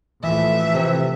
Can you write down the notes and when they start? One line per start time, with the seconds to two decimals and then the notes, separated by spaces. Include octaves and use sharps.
0.23 A1 E3 F3 A3 E5
0.75 C3